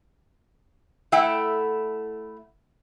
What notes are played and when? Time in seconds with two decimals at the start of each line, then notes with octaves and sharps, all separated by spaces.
1.12 A3 E4 A4 E5 F#5 G5